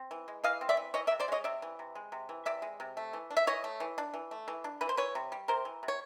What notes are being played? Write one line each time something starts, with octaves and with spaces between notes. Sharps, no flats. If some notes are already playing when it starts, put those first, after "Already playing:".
Already playing: C4
E3
G#3
E3 D#5 F5
C4
D5 E5
E3
E3 C#5 D#5
D5 E5
C3
C5 D5
G#3 C#5 D#5
C3 D5 E5
E3
C3
G#3
C3
E3
C3 D5 E5
G#3
C3
A3
E3
D4
E5
E3 C#5 D#5
A3
E3
D4
E3
A3
E3
D4
E3 B4
C5
E3 B4 C#5
C3
G3
C3 A#4 C5
E3
C3
C#5